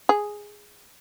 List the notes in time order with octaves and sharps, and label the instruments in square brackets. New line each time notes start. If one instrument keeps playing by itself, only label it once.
[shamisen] G#4